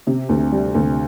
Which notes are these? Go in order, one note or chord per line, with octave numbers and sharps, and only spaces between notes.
C3
D2
G3
D2